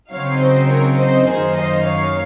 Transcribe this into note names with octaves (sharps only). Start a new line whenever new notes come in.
C#3 F#3 C4 D#4 C#5 F5
C5 D#5
A#4 C#5
C5 D#5
F#2 D#3 A#3 D#4 G#4 C5
C5 D#5
C#5 F5